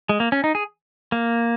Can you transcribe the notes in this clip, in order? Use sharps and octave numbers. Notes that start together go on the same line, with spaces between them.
G#3
A#3
C#4
D#4
G#4
A#3